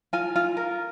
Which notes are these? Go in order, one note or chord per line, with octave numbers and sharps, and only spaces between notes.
F4 G#5
F4
A#4